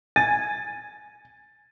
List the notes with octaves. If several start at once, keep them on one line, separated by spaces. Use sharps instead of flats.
G#5 A6